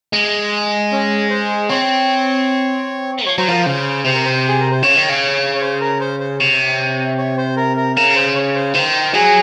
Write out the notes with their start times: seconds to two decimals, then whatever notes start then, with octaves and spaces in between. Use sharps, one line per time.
0.13 G#3
0.92 C#4
1.30 C5
1.69 C4 C#5
3.26 F3 C#5
3.38 F#3 C5
3.48 F3 A#4
3.63 C#3 C5
4.04 C3 C5
4.14 A#4
4.25 C5
4.48 G#4
4.60 A#4
4.71 C5
4.83 C#3 C#5
4.96 D#3
5.09 C#3
5.56 C#5
5.61 C5
5.81 A#4
6.01 C5
6.20 C5
6.39 C3 C#5
7.18 C#5
7.38 C5
7.57 A#4
7.77 A#4
7.96 C#3 A#4
8.16 C5
8.35 C#5
8.55 C5
8.75 D#3 C5
9.14 F#3 G#4